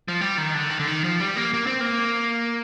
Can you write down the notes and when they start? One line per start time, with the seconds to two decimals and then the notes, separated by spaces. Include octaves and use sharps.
0.08 F3
0.21 G3
0.38 D#3
0.54 D3
0.70 D#3
0.79 D3
0.87 D#3
1.04 F3
1.20 G3
1.36 A#3
1.54 A#3
1.67 C4
1.81 A#3